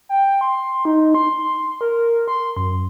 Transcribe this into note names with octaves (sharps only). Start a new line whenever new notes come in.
G5
C6
D#4
C6
A#4
C6
F#2